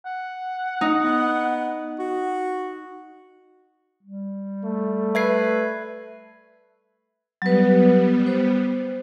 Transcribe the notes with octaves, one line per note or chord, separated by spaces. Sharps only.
F#5
D#4
B3
F#4
G3
A3
B4 E5 G#6 C7
F#3 G3 B3 B4
C5